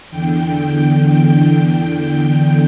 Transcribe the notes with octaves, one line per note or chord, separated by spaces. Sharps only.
E2 D3 G5